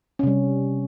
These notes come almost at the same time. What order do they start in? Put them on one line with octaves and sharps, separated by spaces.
C#4 C3 G3